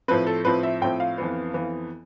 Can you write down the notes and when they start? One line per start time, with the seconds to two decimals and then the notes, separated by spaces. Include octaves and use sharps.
0.08 A2 F3 C4 B4
0.27 A4
0.45 A2 F3 C4 B4
0.63 E5
0.81 A2 F3 C4 G5
1.00 F5
1.18 F2 E3 B3
1.54 F2 E3 B3